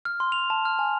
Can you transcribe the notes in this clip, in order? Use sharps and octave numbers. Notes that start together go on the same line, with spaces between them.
F6
C6
F7
A5
F6
G#5